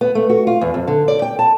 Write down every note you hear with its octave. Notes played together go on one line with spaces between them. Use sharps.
B3
A3
F#4
F4
E2
F2
D3
D5
G5
A5